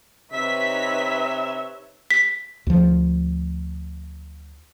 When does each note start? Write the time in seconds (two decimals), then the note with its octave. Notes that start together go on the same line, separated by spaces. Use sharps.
0.32 C3 D#4 B4 C#5 E5 B6
2.11 B6
2.67 D2 F3